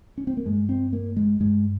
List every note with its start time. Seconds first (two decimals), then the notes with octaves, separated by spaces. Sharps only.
0.18 C#4
0.27 C4
0.37 A#3
0.45 G2 G#3
0.69 C4
0.93 A#3
1.16 G#3
1.40 G2 G#3